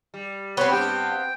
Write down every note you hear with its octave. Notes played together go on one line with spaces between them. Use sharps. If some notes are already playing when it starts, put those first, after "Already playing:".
G3
B3 C4 C#5 B5
G2 G4 G5